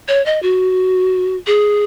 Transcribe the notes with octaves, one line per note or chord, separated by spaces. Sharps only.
C#5
D#5
F#4
G#4